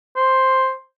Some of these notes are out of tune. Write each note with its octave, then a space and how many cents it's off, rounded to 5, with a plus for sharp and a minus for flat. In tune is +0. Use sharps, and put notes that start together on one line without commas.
C5 +5